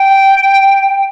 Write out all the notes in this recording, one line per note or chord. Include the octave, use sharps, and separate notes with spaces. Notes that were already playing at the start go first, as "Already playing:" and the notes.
Already playing: G5